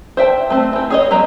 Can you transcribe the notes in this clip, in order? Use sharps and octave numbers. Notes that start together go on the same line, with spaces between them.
C5 E5 G5 A5
A3 C4
E3 G4
G#4 C#5 D#5
F#3 G#3 B3 G4 A#5